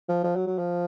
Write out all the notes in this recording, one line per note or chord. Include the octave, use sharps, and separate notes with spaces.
F3
F3
F#3
F#3
F3